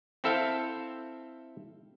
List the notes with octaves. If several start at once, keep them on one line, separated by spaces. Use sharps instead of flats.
C4 E4 A4 E5 F5 G5